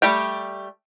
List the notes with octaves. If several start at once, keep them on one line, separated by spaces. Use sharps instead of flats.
G3 A3 G4 G5